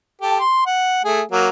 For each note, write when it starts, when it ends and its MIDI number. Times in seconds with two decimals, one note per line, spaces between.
0.21 0.40 67
0.21 0.40 69
0.40 0.62 84
0.66 1.04 78
1.05 1.22 57
1.05 1.22 68
1.31 1.48 54
1.31 1.48 58